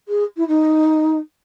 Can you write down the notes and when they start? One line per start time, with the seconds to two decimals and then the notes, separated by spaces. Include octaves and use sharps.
0.08 G#4
0.37 E4
0.47 D#4